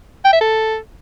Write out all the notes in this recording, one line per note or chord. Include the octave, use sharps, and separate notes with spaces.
G5
E5
A4